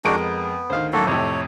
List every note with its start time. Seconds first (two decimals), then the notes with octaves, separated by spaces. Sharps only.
0.05 F2 G#3 D4 D#4 F#4 A#4 D7
0.19 B3
0.70 D2 D#3 C5 F5
0.93 F#2 A2 A#3 F#4 A4
1.07 F2 A2 C3 C#5